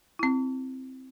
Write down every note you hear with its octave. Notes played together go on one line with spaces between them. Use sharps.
C4 E4